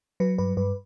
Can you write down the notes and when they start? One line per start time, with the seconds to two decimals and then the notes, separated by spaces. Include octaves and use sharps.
0.20 F#3 B4
0.38 G2 B4
0.57 G2 B4